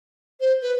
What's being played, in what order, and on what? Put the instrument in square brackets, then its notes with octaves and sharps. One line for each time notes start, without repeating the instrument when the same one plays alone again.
[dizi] C5
B4